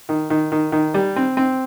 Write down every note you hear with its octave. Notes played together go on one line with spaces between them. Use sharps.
D#3
D#3
D#3
D#3
G3
C4
C4